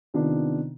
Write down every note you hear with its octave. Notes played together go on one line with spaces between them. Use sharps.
C3 D#3 B3 D4 F4